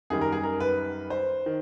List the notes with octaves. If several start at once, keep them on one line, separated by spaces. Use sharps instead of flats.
F#2 D#3 G3 G#4
A#4
G#4
A#4
B4
C5
D#3